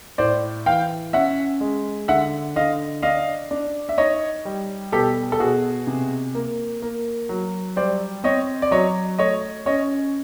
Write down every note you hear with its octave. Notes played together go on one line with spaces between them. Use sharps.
A2 C5 D5
E3 F5 G5
C#4 E5 F#5
G#3
D3 E5 F#5
D3 D#5 F5
D4 D#5 F5
D4
E5
D#4 C#5 D#5
G3
B2 G4 A4
A4
B2 F#4 G#4
C3
A#3
A#3
F#3
G3 C5 D5
C4 C#5 D#5
D5
F#3 C#5 D#5
A3 C#5 D#5
C#4 C#5 D#5